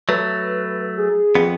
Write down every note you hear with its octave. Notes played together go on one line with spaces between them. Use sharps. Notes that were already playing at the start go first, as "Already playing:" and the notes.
F#3 A3 B4
G#4
F2 B3